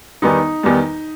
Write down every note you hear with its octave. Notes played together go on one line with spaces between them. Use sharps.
E2 D#3 G3 B3 D#4
E2 D#3 G3 B3